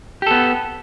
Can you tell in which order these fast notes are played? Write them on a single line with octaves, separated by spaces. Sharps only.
G4 A4 B3